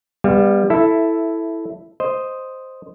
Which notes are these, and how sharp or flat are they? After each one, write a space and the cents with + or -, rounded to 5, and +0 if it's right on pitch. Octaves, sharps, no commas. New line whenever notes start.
G3 +25 B3 +0 F5 -35
E4 +0 A4 +0 E5 +10
C5 +0 D#5 +0